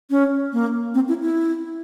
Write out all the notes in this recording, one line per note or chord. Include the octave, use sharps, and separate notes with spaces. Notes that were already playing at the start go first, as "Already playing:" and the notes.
C#4
A#3
C4
E4
E4